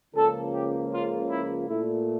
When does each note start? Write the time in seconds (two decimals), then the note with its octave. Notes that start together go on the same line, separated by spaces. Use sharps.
0.14 C#2 C#3 F3 A#3 A4
0.53 G4
0.91 F4
1.29 E4
1.67 A#2 A3 E4